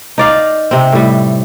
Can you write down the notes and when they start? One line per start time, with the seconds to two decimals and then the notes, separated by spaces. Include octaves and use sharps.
0.18 D#4 D5 F5
0.71 C3 C4
0.92 A2 G3